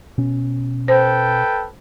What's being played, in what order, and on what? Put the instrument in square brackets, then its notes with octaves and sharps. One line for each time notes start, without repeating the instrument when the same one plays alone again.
[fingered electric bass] B2 C#4
[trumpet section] A4 B4 G5 [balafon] C5